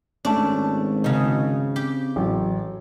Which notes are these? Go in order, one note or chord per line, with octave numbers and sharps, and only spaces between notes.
G#1 A3 C#4 D4
C#3 D#4
C4 G4
A1 F#3